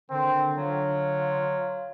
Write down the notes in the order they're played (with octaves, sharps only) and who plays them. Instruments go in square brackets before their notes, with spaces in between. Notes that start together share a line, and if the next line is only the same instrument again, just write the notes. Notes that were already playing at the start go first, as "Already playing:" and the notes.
[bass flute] D3 [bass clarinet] D#3 [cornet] C4
[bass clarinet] F#3 [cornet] F4